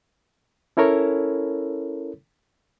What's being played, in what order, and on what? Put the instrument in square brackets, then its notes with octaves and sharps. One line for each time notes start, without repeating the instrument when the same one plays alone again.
[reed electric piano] C#4 E4 A4 A#4 C#5